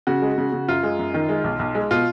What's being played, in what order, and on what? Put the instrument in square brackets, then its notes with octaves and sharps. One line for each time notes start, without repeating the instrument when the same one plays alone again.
[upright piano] C#3 F#4
G#3
C#3
C#3
F#2 F4
G#3
F#2
D#3
G#3
B1
B1
G#3
B2 F4